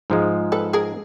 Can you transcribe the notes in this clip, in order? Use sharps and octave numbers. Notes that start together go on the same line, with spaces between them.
G#2 F3 G#3
A4 B4
G#4 A#4